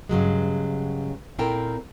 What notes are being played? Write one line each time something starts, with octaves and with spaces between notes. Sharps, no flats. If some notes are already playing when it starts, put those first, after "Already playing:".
G2 C#3 F#3 G#3
A#2 C4 E4 A4 A#4 G5